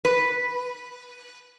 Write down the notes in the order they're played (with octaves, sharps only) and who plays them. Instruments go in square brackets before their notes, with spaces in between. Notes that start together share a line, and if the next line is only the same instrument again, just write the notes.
[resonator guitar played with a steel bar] B4